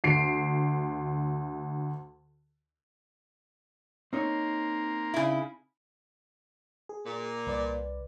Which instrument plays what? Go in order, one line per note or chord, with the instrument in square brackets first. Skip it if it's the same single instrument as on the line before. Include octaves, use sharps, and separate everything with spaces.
[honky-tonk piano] D2 C7 D7
[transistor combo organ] A#3 A#4 C5 [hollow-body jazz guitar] C4 D#4 C#5
[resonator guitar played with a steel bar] C#3 E4
[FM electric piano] G#4
[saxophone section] A#2
[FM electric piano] C2 B4 D5